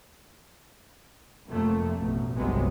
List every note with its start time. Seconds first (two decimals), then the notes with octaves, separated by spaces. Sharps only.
1.48 F1 F2 A3 A#3
1.99 A1 B2
2.36 G1 C2 C3 F#3 G#3 B3